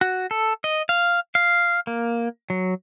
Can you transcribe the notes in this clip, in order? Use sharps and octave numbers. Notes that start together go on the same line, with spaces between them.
F#4
A4
D#5
F5
F5
A#3
F#3